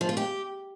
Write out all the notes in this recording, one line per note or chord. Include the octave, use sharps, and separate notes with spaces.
F3
F4
G4